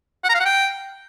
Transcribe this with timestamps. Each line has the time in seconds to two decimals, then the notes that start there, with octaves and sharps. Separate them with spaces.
0.24 F#5
0.29 A#5
0.35 F5
0.40 F#5
0.45 G5